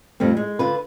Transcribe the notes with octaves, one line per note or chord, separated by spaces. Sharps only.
F2 A2 G3 C4
G#3
D3 F4 B4